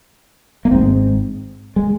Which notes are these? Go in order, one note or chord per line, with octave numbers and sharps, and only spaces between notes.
A#3
G#1 G#2 C4
G#3